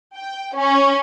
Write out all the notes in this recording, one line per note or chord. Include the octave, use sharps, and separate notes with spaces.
G5
C#4